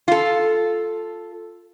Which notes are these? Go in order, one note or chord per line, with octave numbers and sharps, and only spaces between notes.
F4 A4